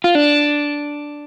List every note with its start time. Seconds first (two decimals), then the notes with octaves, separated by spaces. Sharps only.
0.04 F4
0.15 D4